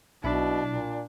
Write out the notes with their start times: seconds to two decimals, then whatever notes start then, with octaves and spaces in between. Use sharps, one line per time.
0.24 B1 B2 D4 E4 B5
0.67 A#2